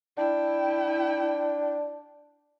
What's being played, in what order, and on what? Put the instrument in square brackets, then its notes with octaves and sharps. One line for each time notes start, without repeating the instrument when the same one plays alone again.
[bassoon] D4 [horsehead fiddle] E4 G5